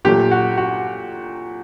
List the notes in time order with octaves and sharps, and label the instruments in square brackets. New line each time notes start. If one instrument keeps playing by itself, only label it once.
[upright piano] A#2 F#3 A3 G4
F#4
F#4